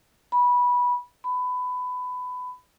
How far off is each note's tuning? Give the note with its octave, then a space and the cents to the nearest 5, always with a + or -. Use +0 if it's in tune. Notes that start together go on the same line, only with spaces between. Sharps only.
B5 -15
B5 +20